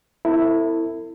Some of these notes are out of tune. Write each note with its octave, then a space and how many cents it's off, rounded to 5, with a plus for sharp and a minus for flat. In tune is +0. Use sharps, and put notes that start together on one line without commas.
C4 -15 E4 +0 A4 +35